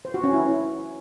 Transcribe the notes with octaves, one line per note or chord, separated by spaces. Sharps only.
C5
F#4
C#4
E4